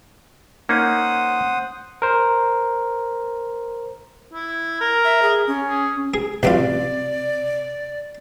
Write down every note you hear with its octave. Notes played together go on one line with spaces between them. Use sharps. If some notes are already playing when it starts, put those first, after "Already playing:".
A#3 C#4 D#4 C5 F#5 D#6
A#4 C5
E4
A#4
E5
G#4
C#4
G#4
G#4
A1 F#2 C3 F4 D5